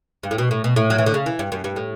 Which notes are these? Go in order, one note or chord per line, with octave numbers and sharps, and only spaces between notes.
G2
A2
B2
A2
B2
A2
F#3
E3
D3
C#3
E3
G2
F#2
G2
A2